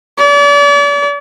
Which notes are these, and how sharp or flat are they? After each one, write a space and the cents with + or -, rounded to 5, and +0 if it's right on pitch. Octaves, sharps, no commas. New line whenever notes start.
D5 -40